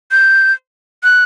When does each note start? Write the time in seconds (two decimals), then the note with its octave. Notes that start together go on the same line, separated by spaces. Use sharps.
0.12 G6
1.03 F#6